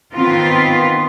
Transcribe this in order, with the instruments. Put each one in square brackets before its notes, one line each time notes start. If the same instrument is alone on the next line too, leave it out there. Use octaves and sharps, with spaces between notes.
[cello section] D#3 B3 C4 F4 B4